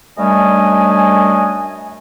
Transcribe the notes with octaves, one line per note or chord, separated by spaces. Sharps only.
F#2 G3 A3 D4 D#5 G#5